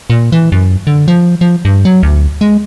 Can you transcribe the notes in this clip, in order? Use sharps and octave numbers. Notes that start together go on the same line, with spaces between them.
A#2
E3
F#2
D3
F3
F3
G2
F#3
D2
G#3